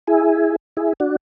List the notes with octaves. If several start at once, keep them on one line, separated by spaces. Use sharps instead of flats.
E4 G#4
E4 G#4
D4 F#4